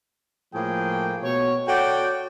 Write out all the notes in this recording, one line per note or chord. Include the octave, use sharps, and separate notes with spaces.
A2 F3 A3 A#3 G#4 G5
B2 C#5
F#4 A4 C#5 D5 G5